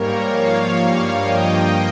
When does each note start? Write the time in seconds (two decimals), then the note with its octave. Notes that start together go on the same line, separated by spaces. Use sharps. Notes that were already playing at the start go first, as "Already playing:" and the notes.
Already playing: G#2 G3 A#3 A#4 C#5
0.30 G#2 F3 A#3 C#5 F5
0.75 G2 G3 A#3
1.19 G2 F3 A#3 D#5 G5